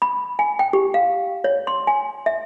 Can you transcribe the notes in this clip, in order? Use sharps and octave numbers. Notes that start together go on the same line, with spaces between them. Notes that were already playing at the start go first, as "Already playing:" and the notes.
B5
G#5
G5
G4
F5
C#5
C6
G#5
E5